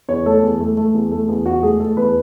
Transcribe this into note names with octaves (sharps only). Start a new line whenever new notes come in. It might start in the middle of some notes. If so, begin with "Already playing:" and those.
E2 C#5
A3 A4
E2
A3
A3
E2
A3
E2
E2 F#4
A3 G#4
A3 A4
E2 B4